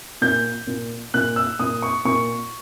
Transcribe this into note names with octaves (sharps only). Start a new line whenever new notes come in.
A#2 G6
A#2
A#2 F#6
E6
A#2 D#6
C#6
A#2 C#6